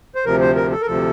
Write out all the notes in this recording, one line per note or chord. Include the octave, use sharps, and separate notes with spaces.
C5
D2 C3 F3 A#4
C5
A#4
A4
A#4
D2 C3 F3 A4